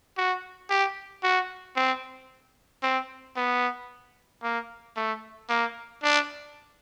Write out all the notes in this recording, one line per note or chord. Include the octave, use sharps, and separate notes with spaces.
F#4
G4
F#4
C4
C4
B3
A#3
A3
A#3
D4